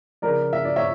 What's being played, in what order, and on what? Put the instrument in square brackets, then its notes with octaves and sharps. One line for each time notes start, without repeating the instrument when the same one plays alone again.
[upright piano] C#3 F3 A#4 D5
E5
D5
C#5 E5